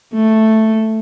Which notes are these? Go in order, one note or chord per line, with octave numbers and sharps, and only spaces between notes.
A3